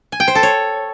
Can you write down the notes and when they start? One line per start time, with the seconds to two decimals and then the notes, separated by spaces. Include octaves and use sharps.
0.12 G#5
0.20 G5
0.28 C5
0.35 A4
0.43 C#5